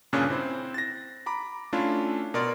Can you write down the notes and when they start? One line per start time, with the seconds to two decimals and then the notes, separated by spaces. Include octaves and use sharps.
0.13 G2 A#2 C#3 C#4 D4 F#6
0.28 C4 E4 C5
0.74 A6 A#6
1.26 A#5 B5 D6
1.73 A3 C#4 D4 E4 F4
2.34 B2 A#4 D5 C6